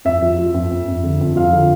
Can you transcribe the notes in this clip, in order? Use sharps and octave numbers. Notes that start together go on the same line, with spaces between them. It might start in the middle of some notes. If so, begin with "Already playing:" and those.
F2 E5
F3
F3
F2
F2
F2
D3
F2
F3 F5
D3